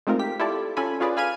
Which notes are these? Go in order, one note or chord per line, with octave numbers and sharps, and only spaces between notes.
G#3 A3 C4 D#4 F4 A#4
G4 B6
E4 F4 G4 A4 D5
C#4 F4 A4 G#5 B5
C#4 F4 G#4 B4 D5
F5 G#5 B5 F6 G#6 D#7